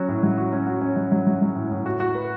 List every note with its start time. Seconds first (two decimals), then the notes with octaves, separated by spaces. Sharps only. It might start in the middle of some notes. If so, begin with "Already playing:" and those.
Already playing: F#3 C#4 F#4
0.08 A2
0.23 F#3
0.38 F#4
0.52 C#4
0.67 F#4
0.81 C#4
0.96 F#3
1.12 F#3
1.27 F#3
1.42 F#3
1.55 A2
1.71 A2
1.86 F#4
2.00 F#4
2.15 B4